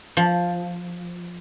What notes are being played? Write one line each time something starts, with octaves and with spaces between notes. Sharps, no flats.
F3